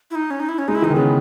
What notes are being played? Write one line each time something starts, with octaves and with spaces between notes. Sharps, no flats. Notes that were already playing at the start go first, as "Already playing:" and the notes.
E4
D#4
C#4
D#4
E4
C#4
G#3 D#4
E4
E3 D#4
D#3
C#3 B3